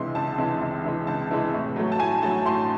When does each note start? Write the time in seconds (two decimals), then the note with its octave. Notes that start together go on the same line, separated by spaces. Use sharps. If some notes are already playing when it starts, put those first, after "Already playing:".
Already playing: C#2 C3 E3 G#3 C6
0.15 C#2 A5
0.38 C3 E3 G#3
0.61 C#2
0.84 C3 E3 G#3
1.07 C#2 A5
1.31 C3 E3 G#3
1.53 A2
1.76 F#3 A3
1.92 A5
1.99 A2 G#5
2.22 F#3 A3 A5
2.45 A2 C6